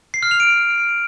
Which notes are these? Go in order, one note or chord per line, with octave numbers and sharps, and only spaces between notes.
C7
F6
F7
D7